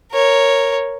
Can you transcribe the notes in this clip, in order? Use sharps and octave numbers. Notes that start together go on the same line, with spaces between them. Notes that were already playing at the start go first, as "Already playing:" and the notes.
A#4 C#5